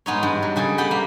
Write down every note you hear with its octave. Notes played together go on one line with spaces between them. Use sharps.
G#2 B3 D#4 C#5
G2
F#3
C#3 G3 G#4 A4
B3 G4 G5 B5
A#3